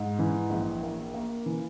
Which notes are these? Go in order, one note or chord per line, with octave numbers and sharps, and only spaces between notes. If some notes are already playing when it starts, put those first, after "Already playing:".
Already playing: G#2
E3
A#1
A#3
A#3
E3